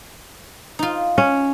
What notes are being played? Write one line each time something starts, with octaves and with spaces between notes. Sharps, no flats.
D#4 F4
C#4